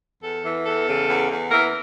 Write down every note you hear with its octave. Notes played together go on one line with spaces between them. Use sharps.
E2 A4
E3
E2 A4
C#3
E2
E2
E3 A#4